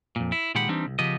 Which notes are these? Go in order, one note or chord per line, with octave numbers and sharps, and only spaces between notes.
F2 A#2
E4
A#2 D#3 G#3 G4 F#5 B5
E3 G3 C4 D4 D#4
C2
C#3 F3 B3 G4 D#5